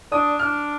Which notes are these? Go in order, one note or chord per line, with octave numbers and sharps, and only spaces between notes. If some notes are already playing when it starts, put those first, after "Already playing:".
D4 D#6
D4 F6